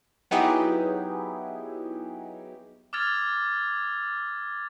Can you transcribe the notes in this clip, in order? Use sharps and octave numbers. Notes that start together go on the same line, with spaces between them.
F#3 B3 D#4 E4 G4 G#4
D6 E6 F6 G#6 A6 F7